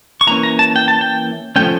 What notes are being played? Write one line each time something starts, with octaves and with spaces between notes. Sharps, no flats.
C#6
E3 A#3 C#4 A#5
A#5
A5
G5
A5
G5
F3 A3 C#4 G5